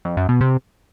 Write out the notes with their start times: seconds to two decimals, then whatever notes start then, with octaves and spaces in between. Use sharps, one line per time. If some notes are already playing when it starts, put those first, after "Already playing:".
0.05 F2
0.17 F#2
0.29 B2
0.41 C3